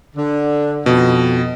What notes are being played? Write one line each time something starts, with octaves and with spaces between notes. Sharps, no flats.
D3
F2 B2 D#5